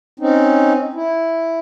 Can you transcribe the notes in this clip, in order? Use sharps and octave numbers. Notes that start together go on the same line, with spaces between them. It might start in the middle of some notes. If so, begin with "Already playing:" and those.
C4 C#4 D#4
E4